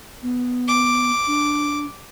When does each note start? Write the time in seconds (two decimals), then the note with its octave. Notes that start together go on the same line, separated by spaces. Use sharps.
0.22 B3
0.68 D6
1.27 D4